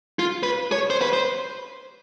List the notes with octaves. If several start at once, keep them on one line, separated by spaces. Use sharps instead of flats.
F4
B4
C#5
C5
B4
C5